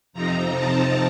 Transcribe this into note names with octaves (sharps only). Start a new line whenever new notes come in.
F2 C3 F3 C4 D#4 A#5
A5